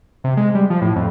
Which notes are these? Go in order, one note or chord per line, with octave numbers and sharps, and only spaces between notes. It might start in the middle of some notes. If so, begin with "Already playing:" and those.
C3
G#3
G3
F3
A2
F2